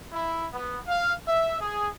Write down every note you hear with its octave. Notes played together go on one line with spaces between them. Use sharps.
E4
B3
F5
E5
G#4